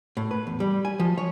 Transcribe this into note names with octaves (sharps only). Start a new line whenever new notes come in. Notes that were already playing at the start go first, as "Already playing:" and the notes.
A2
B4
E2
G3
G#5
F3
C#5